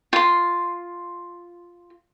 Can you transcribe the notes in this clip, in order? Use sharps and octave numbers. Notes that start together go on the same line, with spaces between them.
F4 C6